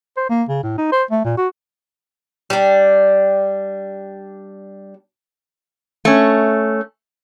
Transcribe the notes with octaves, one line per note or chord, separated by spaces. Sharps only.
C5
A#3
C#3
A2
D#4
C5
A3
A#2
F#4
G3 D4
A3 C#4